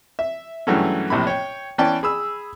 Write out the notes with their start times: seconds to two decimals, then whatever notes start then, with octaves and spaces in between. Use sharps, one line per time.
0.19 E5
0.67 G2 C#3 E3 F#3 A3 C#4
1.10 A#1 A2 C3 A#3 B5
1.27 C#5 G5
1.78 E3 B3 C#4 D5 G5 A5
2.03 G#4 B5 E6